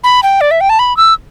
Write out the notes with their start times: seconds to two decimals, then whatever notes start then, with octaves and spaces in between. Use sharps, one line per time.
0.04 B5
0.23 G5
0.41 D5
0.51 E5
0.61 G5
0.70 A5
0.79 B5
0.97 E6